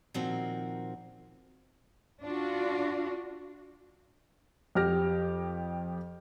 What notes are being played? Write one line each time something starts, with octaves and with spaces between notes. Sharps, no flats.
A#2 D#3 F3 A#3 C4 F#4
D4 F4 F#4
F2 G4 F6 A#6